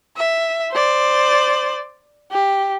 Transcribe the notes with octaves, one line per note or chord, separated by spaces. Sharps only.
E5
C5 D5
G4